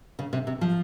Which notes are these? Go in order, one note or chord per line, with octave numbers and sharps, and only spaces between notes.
C#3
C3
C3
F3